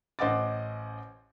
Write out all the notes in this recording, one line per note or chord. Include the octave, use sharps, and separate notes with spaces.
A1 C5 D#5 F#5 D6 A6